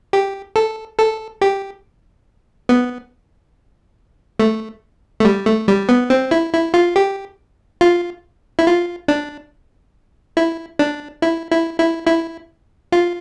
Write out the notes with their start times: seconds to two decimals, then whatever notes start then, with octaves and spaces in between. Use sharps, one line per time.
0.13 G4
0.56 A4
0.98 A4
1.42 G4
2.69 B3
4.40 A3
5.20 A3
5.25 G3
5.46 A3
5.68 G3
5.89 B3
6.10 C4
6.31 E4
6.53 E4
6.74 F4
6.96 G4
7.81 F4
8.59 E4
8.66 F4
9.08 D4
10.37 E4
10.79 D4
11.22 E4
11.51 E4
11.79 E4
12.07 E4
12.92 F4